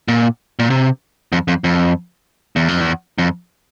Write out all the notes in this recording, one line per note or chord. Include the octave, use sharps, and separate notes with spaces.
A#2
A#2
C3
F2
F2
F2
E2
F2
E2
F2